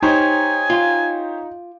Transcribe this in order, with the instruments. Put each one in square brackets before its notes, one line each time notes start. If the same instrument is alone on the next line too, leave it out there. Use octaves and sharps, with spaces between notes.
[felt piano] D#4 [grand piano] G4 C5 C#5 [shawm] G#5
[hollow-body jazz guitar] F4